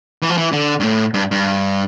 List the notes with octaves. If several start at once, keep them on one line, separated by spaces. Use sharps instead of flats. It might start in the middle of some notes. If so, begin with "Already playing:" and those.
E3
F3
E3
D3
G2
A2
G2
G2